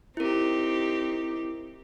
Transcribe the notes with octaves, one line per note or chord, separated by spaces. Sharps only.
C4 D#4 E4 G4 A#4